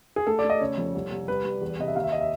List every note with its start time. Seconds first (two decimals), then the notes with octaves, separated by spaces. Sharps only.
0.16 G#4
0.27 A3 A4
0.39 D5
0.44 A3
0.50 D#5
0.61 C#3 C#5
0.78 F2
0.94 C2
1.12 C2
1.28 G3 B4
1.45 G3
1.62 E2
1.79 C3 D#5
1.88 E5
1.95 D#2 F5
2.04 E5
2.12 D#5
2.21 E5